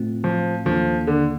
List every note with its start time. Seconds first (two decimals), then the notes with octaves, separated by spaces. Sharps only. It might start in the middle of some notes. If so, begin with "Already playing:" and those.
Already playing: A2 A3 C4 F4
0.24 F3
0.65 D#2 D#3 F3 A#3 D4 A4
1.07 D3